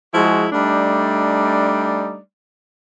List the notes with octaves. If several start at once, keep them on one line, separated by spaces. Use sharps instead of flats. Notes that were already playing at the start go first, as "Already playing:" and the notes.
F3 G#3 E4 F#4 G#4
G3 A3 D4 D#4 D5